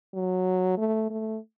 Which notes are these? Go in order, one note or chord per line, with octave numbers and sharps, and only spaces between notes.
F#3
A3
A3